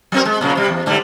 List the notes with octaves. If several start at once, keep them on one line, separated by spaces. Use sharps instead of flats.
F#3 C4 A#4
G#3
A#2 C#3 F#3
C3 G3
E2
G#2 D3 G3